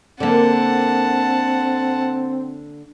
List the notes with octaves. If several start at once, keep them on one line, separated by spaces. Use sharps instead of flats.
D3 A#3 C4 F#5 A5